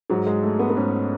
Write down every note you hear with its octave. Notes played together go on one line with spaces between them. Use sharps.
G#2 F#3
G#3
A3
B3
B3
G#2 C#4